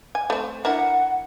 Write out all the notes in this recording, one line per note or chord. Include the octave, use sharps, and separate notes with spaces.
G#5
A3 C4
D4 E4 A#4 F#5